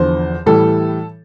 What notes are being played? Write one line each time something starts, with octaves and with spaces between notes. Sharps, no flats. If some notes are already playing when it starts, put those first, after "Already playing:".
Already playing: E2 D3 F3 C5
A2 E3 G3 A4